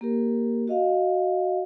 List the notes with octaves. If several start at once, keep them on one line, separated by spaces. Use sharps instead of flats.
A#3 G4 A#4
F#4 D#5 F5